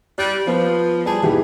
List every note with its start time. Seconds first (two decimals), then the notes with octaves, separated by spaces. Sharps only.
0.18 G3 F#6
0.47 F3 B3
1.06 G3 G#4 A5
1.23 D#2 B2 E3 G4 G#4